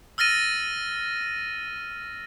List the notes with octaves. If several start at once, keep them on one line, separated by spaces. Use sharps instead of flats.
E6 F6 A6 A#6 D#7